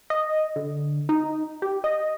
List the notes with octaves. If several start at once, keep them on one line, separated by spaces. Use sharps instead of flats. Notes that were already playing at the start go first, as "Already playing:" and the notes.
D#5
D3
D#4
G4
D#5